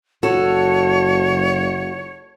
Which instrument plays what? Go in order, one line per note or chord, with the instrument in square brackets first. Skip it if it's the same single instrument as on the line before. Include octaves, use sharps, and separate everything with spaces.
[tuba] F#1 [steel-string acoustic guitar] F#4 [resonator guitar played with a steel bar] A4 [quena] C#5